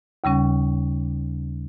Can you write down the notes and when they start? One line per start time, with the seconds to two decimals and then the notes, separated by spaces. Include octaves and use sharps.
0.24 D#2 C#3 G3 C#4